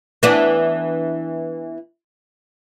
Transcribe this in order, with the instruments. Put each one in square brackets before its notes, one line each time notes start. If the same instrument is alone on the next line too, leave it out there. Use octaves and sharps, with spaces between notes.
[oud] E3 B3 D4